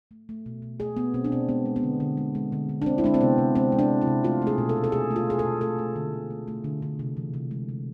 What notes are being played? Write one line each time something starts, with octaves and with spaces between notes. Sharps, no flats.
A3
A3
B2
B2
A3 G#4
A3 B3
B2 C4
D4
B2 C4
G#3 B3
G#3
B3
D3
D3
G#3
G#3
D3
D3
D4
G#3 C4
E4
G#3 D4
C4
C3 B3
C3
G#3 C4
G#3
D4
C3
E4
C3
A3 F4
A3
G#4
B2
A4
B2
A4
A3 G#4
A3
F4
B2 G#4
A4
B2
A3 A4
A3
D3
D3
A3
A3
D3
D3
C3
E3
C3
G#3
C3